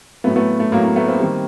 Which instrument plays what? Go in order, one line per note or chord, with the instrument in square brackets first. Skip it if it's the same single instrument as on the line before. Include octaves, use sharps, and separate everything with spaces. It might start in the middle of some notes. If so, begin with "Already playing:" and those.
[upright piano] A2 F#3 A3 B3
A3 B3
A3
A2 F#3 A#3
A#3
A3 B3
A#3 C4
D#3 G3